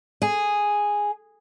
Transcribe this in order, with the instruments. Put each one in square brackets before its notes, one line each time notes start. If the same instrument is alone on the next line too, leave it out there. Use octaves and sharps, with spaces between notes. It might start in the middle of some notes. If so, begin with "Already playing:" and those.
[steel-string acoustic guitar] G#4